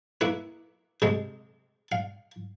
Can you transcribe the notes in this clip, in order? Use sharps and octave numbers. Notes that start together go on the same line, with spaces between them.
A#3 E4 B4
C3 G#3
F5